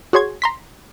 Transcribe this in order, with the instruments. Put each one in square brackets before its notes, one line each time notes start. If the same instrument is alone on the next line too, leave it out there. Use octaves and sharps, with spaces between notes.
[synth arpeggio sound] F#4 G#4 C#5 C6 G#6
A#5 C6 B6